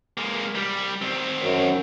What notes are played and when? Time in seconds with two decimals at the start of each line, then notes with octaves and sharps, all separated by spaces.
0.18 G#3 A#3
0.55 C2 G3
1.02 D#3 C4
1.41 F#2